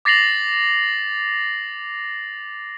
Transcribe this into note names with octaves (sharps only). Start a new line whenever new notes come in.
D6 A6 A#6 C7 F7 F#7